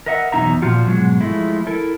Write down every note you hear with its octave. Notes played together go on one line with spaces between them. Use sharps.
A#4 B4 D#5 E5 F#5
E2 B2 F#3 D#4 E5 A#5
A#2 F3 F4 F#4
G#2 B2 F#3 G#3
F3 G#3 A3 E4
E4 A4 A#4